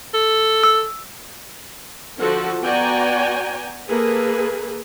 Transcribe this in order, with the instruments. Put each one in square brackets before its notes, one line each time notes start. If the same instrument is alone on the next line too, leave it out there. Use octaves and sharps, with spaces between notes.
[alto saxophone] A4
[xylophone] E6
[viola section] D3 F3 F#4 A4
B3 F#4 D5 G5 G#5 A#5
A#3 G#4 A4 B4